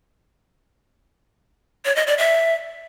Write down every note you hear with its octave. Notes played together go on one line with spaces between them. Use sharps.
C#5
D#5
D5
E5